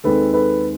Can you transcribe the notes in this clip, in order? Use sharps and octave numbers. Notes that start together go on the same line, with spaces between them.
D#2 D#3 G#3 C4 A4 B4
A4 B4